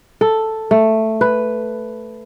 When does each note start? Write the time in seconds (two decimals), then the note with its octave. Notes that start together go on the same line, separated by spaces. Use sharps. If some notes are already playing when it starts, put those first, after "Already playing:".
0.21 A4
0.71 A3
1.21 B4